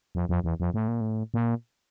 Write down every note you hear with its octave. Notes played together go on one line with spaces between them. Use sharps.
F2
F2
E2
F2
A2
A#2
A2
A#2